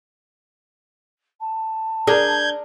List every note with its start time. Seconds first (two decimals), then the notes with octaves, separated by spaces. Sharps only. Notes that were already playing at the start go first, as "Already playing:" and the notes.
1.40 A5
2.07 D4 G#4 A#4 G6 G#6